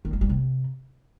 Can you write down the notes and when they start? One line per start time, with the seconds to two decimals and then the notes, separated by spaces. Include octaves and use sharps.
0.05 D#3
0.13 G#3
0.21 G3
0.29 C3